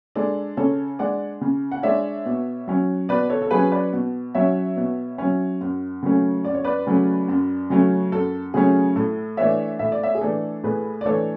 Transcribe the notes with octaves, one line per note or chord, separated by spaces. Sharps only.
G#3 D4 A4
C#3 A4 C#5
G#3 D4 D5 F#5
C#3
F#5
G#3 D4 C#5 E5
B2
F#3 C#4
B2 B4 D5
A4 C#5
A4
F#3 C#4 G#4 B4
B4 D5
B2
F#3 C#4 C#5 E5
B2
F#3 C#4
F#2
C#3 F#3 A3 C#4
F#2 D5
C#5
B4 D5
C#3 F#3 A3 C#4
F#2
C#3 F#3 A3 C#4
F#2 A4
C#3 F#3 A3 C#4 G#4
A2 A4
E3 A3 D4 C#5 E5
A2 E5
D5
C#5 E5
G#4
E3 A3 D4 A4
A2 G#4 B4
D5
E3 A3 D4 A4 C#5